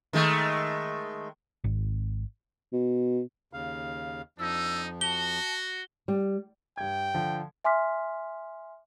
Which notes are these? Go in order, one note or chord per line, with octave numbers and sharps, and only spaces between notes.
D#3 G#3 A3
G#1
B2
D#2 C#3 F5
F2 F3 D4 D#4 E6
F#4 A5 G7
G3
G2 G5 G#6
D3 F3
E5 G#5 C6 D6 F6 B6